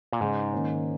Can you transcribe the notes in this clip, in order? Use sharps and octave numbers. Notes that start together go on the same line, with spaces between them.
A#2
G#2 C#3 G#3 D#4
D#3 A#3 C#4